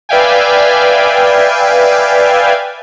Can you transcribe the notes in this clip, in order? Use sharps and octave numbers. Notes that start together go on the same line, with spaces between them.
B4 D5 E5 F5 G5 G#5